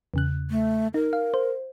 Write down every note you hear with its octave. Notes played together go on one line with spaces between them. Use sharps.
E2 C#3 F#6
A3
D#4 A#4
F5
C5